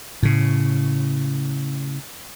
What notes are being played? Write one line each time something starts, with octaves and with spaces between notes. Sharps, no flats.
A2 C#3